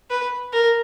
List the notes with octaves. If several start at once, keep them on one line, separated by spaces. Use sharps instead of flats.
B4
A#4